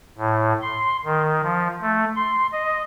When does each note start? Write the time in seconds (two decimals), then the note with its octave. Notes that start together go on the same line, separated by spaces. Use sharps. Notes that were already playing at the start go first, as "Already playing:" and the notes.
0.18 A2
0.62 C6
1.05 D#3
1.43 F3
1.82 A3
2.16 C6
2.52 D#5